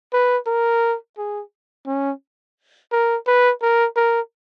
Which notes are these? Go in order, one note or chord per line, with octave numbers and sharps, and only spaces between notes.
B4
A#4
G#4
C#4
A#4
B4
A#4
A#4